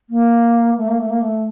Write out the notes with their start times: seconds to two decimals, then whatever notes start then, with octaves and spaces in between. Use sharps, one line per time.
0.10 A#3
0.78 A3
0.88 A#3
0.99 A3
1.10 A#3
1.21 A3